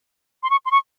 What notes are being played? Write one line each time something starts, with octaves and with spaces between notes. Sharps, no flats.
C6
C#6
C6
C#6